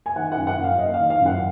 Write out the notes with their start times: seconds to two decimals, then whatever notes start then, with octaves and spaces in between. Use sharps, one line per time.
0.06 G#5
0.16 D#3 F#5
0.32 F#5
0.37 F#2
0.47 F#5
0.58 F#2
0.64 F5
0.78 A#3 D#5
0.94 F5
0.99 D#3
1.10 F5
1.20 F#2
1.26 F#5